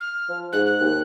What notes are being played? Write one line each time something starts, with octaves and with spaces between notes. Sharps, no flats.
F6
F3
G#2 F#6
F#6
D#2